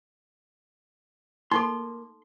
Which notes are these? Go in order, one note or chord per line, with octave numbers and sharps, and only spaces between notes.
A#3 D#4 A4 C6